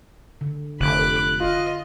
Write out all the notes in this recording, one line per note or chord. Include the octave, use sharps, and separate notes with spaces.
D3
F1 D3 B5 D6 F#6
F4 D#5